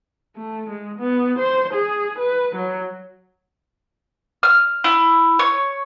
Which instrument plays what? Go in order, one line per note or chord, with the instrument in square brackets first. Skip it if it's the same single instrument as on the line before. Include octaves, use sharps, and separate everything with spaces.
[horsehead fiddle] A3
G#3
B3
C5
G#4
B4
F#3
[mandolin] F6
E4
C#5